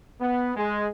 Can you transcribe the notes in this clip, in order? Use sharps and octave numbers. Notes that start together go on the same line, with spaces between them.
B3
G#3